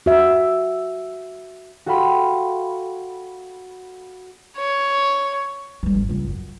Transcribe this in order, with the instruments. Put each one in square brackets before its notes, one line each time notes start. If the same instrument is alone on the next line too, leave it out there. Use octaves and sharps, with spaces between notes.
[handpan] F#4 E5
[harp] F#4 A4 F5 G5 B5 C6
[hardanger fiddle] C#5
[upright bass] E3 G3
G#1 D2
C#2 G2
F#2